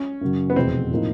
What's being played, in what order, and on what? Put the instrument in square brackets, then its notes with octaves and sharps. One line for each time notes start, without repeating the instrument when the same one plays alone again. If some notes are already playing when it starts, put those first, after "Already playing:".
Already playing: [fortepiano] C#4
[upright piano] F#2 C#3 F#3
[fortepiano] B3
[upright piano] F1 E2 B2 [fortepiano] C4
[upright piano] A2 F3 A#3 D#4